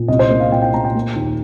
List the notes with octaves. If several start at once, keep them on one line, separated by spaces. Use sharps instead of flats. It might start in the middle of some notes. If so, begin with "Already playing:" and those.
Already playing: A#2
C2 D#5
C5
A#3
F5
A#2 G5
G5
A#2 A#5
G5
A#3
D#2